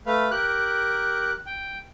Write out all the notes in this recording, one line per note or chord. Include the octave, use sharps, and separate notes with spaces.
A3 B4 F5
G4 A#4 F#6
G5